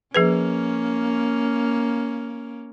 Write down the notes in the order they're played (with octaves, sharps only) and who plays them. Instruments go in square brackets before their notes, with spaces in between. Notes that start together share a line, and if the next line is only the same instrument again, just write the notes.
[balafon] F3 G#4 B4 [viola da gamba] A#3 C#4